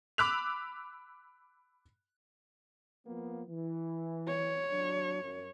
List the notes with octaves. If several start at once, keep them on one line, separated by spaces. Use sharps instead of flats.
B5 D6 E6 F#6 B6 F7
F3 A#3 B3
E3
C#5
F#3 D4
F#2